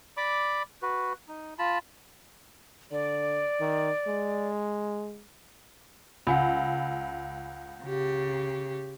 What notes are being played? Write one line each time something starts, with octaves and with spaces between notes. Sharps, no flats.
D5 B5 D6
F#4 B4
D#4
F4 A5 B5
D3 D5
D#3
G#3
C#2 F#5 G#5 B5
C#3 G4